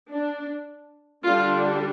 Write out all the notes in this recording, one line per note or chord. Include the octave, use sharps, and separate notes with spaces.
D4
D3 G3 D4 F4